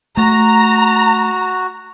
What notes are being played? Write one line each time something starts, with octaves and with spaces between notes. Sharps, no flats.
A3 F#4 A#5